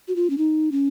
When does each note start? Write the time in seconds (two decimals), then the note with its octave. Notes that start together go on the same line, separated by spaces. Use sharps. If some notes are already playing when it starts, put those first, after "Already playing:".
0.08 F#4
0.16 F4
0.30 C#4
0.38 D#4
0.72 C#4